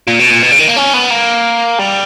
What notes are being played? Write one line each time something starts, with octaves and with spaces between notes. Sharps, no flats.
A#2
B2
A#2
B2
C#3
D#3
A#3
C#4
B3
A#3
G3